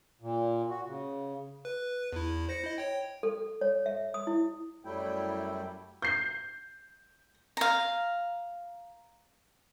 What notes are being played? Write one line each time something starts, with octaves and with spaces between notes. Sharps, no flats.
A#2
F#4
C#3
B4
E2 E4
C5 A#6 C#7
E4 D#5
C#5 G5
A4
C#5
E5
D#6
E4
F#2 F#3 G3 A3 E4 G5
G6 C7
F5 A#5